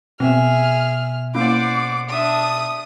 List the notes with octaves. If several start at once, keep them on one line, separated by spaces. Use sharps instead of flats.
B2 C4 G#4 E5 F6
A#3 C#4 E4 C5 D5 F#5 D6
D4 E5 A5 D#6